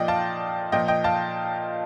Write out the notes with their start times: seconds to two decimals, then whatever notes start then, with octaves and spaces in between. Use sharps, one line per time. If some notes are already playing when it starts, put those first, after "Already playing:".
Already playing: A#2 F3 D5 D#5 G5
0.08 F5 A5
0.72 A#2 F3 D#5 G5
0.88 D#5 G5
1.04 F5 A5